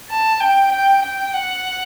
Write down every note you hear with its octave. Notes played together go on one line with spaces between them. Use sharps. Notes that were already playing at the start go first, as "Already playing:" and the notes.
A5
G5
G5
G5
F#5